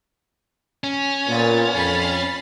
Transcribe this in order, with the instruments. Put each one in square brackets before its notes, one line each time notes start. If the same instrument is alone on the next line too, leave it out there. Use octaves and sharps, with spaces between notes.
[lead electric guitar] C#4
[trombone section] A#2 [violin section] B3 A6
[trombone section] F2 [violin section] B5 A6 C7